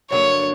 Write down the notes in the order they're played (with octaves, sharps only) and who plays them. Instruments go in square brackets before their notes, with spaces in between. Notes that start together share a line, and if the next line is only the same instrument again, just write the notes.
[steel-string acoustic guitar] G2 D3 F#3 A#3 D4 [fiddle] C#5